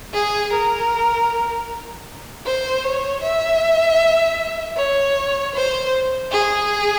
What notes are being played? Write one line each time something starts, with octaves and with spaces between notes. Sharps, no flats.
G#4
A#4
C5
C#5
E5
C#5
C5
G#4